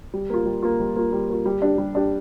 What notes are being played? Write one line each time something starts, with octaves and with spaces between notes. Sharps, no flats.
G3
A#3 F4
G3
A#3 F4
G3
A#3 F4
G3
A#3 F4
G3
D4 G4
G3
D4 G4